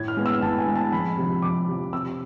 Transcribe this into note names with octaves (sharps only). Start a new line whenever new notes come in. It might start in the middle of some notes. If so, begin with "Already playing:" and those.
Already playing: A2 G#6
F6
G#3 B3
E6
A2 A5
G#5
G#3 B3
A5
F2 B5
C3 F3
F2 D6
C3 F3
C3 E6